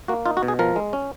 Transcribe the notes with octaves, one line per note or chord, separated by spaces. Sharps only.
A#3 F#4
D#4 F4
F#4
B2
G#4
F3 A#4
G#3
C#4